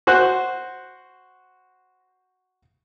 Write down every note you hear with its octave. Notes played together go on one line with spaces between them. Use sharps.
F#4 C5 F#6